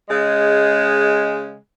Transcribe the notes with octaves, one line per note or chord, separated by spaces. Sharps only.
C#3 G#3